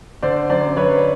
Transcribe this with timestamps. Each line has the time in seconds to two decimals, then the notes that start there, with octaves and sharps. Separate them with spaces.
0.22 D3 C5 D5
0.50 F#2 C5 D5
0.76 F#2 B4 C#5